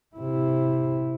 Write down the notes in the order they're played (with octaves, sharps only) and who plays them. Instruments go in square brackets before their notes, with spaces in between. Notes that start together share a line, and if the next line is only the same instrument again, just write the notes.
[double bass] C3 E4